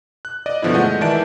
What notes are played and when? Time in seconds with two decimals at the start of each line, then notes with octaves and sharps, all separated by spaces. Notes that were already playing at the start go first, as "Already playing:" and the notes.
0.25 F#6
0.46 D5 D#5
0.62 G2 B2 D3 F3 B3 E4
0.74 G#3 A3 D#5 F#5 G6
1.01 D#3 E3 D5 E5 A5 D7